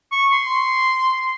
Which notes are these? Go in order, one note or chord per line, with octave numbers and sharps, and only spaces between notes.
C#6
C6